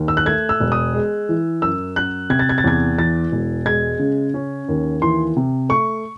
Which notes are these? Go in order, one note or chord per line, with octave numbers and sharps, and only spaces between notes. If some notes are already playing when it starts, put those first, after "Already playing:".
Already playing: D#2
E6
F#6
A3 G#6
E6
E1
D#6
G#3
E3
F#2 E6
F#2 F#6
C3 G#6
A6
G#6
A6
E2 G#6
E3 A6
E1
G#3 G#6
C#3
C#4
D#2
E3 C6
C3
A3 C#6